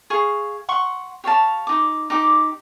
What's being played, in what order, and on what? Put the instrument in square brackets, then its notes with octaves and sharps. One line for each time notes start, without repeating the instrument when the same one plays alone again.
[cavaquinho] G#4 F5 C#6
F#5 C6 C#6
G4 C#5 F5 A5
D#4 D6
D#4 G4 D6